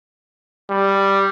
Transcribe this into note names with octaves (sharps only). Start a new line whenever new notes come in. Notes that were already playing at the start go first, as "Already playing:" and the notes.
G3